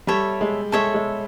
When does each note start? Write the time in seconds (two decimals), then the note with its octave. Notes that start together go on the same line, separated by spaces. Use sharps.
0.07 G3 A4 C#5 E5
0.41 G#3
0.72 G#3 A4 C#5 E5
0.94 G#3